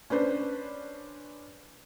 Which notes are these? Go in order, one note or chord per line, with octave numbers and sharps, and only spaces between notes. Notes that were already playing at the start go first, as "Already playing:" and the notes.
C#4 D4 B4 C5